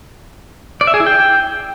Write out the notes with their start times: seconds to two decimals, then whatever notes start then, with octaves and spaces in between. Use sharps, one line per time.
0.81 D5
0.87 E5
0.94 G#4
1.00 E4
1.06 G5